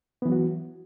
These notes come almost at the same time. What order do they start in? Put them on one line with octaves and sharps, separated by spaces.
B3 E3 F#3 F#4